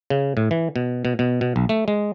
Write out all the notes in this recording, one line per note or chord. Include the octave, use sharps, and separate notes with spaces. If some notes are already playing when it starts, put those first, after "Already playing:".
C#3
A2
E3
B2
B2
B2
B2
B1
A3
G#3